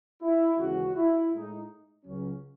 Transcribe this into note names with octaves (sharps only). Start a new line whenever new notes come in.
E4
D#2 C#3 E3 G#3 C#4 F#4
E4
A2 G#3 D#4
C#2 C#3 F#3 C#4